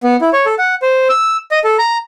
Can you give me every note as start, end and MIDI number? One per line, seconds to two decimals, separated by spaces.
0.04 0.16 59
0.21 0.30 64
0.33 0.46 73
0.46 0.55 69
0.59 0.75 78
0.82 1.08 72
1.09 1.37 88
1.51 1.59 75
1.64 1.77 69
1.79 1.98 82